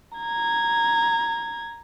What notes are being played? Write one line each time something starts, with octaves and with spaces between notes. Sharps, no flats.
A#5 G#6